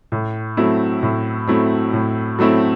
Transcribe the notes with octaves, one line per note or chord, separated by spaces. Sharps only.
A2
F#3 A3 C4 E4
A2
F#3 A3 C4 E4
A2
F#3 A3 C4 E4